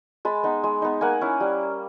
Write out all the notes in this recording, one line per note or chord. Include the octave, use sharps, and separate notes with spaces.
G#3 A5 B5
B3 D#4
G#3
B3 D#4
A#3 F#5 G#5
C#4 E4
G3